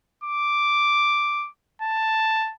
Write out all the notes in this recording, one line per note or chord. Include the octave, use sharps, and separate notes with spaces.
D6
A5